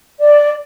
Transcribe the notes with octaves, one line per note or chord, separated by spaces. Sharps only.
D5